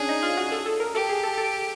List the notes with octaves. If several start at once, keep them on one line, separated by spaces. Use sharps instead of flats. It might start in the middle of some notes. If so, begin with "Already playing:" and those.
Already playing: C#4 D4 G#4
D#4
F4
F#4
A4
A4
A#4
G4 A4
G#4
A4
A4